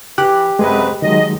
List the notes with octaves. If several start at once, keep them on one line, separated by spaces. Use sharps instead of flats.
E3 G4 F#6
F#2 C3 G#3 G#4 B4 D#5
D#3 F#3 G#3 D#5